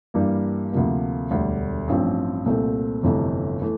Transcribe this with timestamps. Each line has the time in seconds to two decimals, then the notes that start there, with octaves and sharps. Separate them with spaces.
0.14 G2 E3 G3 A#3
0.73 D2 C3 F3 A#3
1.30 E1 D2 D3 G3
1.88 A1 G2 F3 C4
2.46 C2 A#2 A3 C4
3.03 G1 F2 C3 E3 A3
3.62 E3 A3